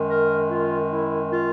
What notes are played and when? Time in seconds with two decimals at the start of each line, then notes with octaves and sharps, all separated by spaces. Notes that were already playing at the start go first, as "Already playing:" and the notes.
Already playing: F#2 D#3 G#3
0.10 A#4
0.51 F4
0.92 E4
1.33 F4